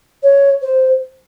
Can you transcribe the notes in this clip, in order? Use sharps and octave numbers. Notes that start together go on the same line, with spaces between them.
C#5
C5